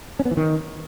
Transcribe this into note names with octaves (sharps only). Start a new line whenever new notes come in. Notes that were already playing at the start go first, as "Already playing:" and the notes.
C#4
B3
E3
D#3